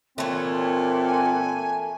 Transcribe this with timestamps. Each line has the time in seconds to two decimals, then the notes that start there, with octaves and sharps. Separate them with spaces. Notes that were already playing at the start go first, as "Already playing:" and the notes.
0.18 A#2 E3 A3 C4 C#5
1.06 G#5